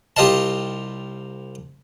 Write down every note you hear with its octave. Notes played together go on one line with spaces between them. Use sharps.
C2 F4 G4 D#5 F5 A5